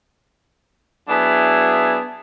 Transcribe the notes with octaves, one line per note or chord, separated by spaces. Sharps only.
F#3 B3 D4 E4 G#4